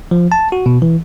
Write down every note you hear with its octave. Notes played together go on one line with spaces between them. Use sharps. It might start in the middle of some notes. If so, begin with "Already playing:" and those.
F3
A5
F#4
B2
E3